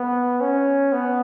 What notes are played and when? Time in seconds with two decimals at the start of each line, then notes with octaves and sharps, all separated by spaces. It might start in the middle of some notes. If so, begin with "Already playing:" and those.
Already playing: B3
0.41 C#4
0.92 B3